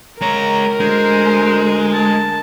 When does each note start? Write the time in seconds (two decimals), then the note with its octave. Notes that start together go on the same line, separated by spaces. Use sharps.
0.21 G#3 A#4 C#5 A#5
0.80 D2 G#3 C5
1.94 A5